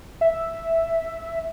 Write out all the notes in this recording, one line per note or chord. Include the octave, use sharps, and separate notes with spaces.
E5